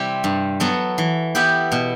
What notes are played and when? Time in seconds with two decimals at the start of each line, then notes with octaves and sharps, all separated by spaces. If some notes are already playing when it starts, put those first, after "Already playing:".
Already playing: C3 G3 C4 E4 G4
0.24 G2
0.60 F#3 B3 F#4 A4
0.98 E3
1.35 B3 E4 G4
1.72 B2